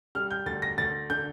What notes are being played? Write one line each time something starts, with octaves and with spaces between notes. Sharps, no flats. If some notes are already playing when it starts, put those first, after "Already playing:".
G3 F6
G6
D2 A6
A#6
D2 A6
D3 G6